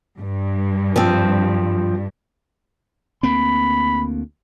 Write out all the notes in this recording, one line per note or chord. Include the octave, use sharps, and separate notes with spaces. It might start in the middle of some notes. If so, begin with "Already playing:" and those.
G2
F3 C4
D2 A#3 C4 B5